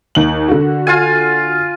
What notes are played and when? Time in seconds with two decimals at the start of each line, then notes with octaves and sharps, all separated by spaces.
0.15 D#2 F#7
0.48 D3 F#4
0.87 F4 F5 G#5